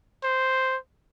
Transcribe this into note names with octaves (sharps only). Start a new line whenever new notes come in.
C5